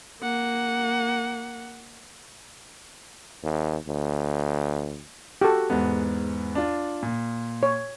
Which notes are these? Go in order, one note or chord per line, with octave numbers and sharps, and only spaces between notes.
A#3 F#5
D#2
D2
F#4 G4 A4
E2 G#2 B3
D4 F4
A#2
C#5